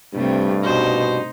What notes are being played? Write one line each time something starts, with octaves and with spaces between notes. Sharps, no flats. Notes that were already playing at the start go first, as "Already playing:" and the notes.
G2 C3 G3 A3 C4
B2 D#4 C5